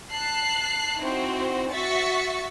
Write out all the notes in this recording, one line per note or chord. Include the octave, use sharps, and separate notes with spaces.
A5 F#6 C7
C4 D#4 E4 F#4 C5
F#4 E5 C#6 A6 B6 C#7